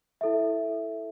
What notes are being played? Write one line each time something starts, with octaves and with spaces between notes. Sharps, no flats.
E4 A4 E5